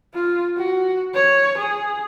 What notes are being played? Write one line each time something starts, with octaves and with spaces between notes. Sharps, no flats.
F4
F#4
C#5
G#4